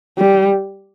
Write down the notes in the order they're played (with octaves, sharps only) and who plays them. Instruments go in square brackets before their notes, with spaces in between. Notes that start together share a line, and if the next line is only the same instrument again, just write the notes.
[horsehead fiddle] G3